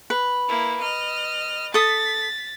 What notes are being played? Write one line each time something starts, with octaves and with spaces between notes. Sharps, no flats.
B4
A#3 E4
D#5 F6
A4 D#6 A6 B6